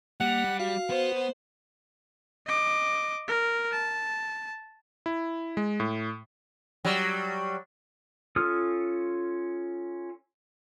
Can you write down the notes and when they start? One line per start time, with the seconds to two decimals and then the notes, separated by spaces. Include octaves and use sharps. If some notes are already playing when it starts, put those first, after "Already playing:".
0.20 G3 A#3 F#5
0.60 F#4 F5
0.90 B3 C5
2.47 D#5 D6
3.28 A#4
3.72 A5
5.06 E4
5.57 G#3
5.80 A2
6.85 F#3 G3
8.36 C#4 F4 A4 D#6 F6